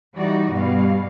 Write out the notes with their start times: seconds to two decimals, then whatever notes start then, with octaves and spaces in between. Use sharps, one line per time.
0.15 E3 G3 D#4 F#4 D5
0.52 G2 B2 G3 F5